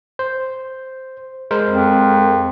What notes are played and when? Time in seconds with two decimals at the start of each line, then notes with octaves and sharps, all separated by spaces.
0.19 C5
1.51 G#3 A#4 C5
1.70 F2